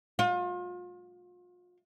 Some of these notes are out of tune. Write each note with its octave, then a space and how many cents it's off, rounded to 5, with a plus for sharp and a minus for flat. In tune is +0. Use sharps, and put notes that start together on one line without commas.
F4 +35